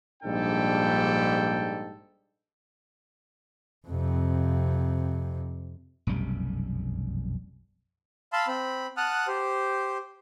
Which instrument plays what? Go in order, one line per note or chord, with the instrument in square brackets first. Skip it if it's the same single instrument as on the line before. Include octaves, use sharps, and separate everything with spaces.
[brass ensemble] A#1 G#2 G3 D4 A4 G5
[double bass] F2 C3
[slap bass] F1 B1 F#2 G3
[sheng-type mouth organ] F5 A5 B5 C6 E6
C4 B5
F#5 A5 D#6 F6 F#6
G4 C5